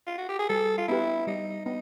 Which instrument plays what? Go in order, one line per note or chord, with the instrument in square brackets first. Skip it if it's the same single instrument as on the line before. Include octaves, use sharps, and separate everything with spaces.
[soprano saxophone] F4
F#4
G4
G#4
[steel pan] G3 [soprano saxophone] A4
[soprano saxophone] F4
[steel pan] B3 D4 G4 B4 [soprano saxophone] E4
[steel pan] G3 [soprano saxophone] D#4
[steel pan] B3 D4 [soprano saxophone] D#4